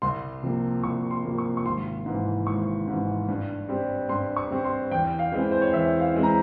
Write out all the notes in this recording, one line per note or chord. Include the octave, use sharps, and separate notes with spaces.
C2 C6
C3 F3 A#3
C2 C#6
C6
C3 F3 A#3
C#6
C#6
G#1 C6
G#2 E3
G#1 C#6
G#2 E3
G2
G3 C4
G2 C6
C#6
G3 C4
C6
E2 G5
F5
E3 G#3 C4
C5
C#5
E2 E5
F5
E3 G#3 C4
A#5